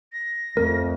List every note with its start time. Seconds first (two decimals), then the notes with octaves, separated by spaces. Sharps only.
0.13 A#6
0.57 F2 A3 C4 A#4